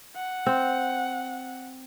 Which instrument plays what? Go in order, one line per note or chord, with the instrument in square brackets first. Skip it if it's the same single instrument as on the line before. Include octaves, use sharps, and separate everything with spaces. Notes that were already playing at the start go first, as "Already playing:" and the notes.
[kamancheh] F#5
[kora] C4